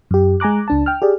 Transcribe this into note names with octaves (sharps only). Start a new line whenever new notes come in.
F#2 G4
G#3 G#5 A#5 D6 F#6
C#2 D4 A5
G5 F6
G4 G#4 D5